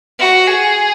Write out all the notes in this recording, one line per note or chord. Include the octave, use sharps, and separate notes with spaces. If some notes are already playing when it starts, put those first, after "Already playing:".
F#4
G#4